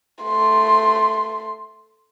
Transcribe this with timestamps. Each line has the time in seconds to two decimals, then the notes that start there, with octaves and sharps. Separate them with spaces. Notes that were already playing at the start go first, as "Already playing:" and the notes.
0.23 A3 C6